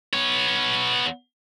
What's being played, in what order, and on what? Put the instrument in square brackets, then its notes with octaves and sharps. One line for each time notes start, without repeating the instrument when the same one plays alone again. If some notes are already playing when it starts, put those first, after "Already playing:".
[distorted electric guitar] B3 C#5